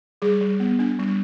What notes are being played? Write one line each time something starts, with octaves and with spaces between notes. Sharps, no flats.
G3 G#4
G3
B3
D4
G3